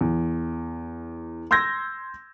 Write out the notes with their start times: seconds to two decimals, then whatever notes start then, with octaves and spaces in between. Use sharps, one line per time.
0.01 E2
1.51 C6 E6 G6 G#6 A#6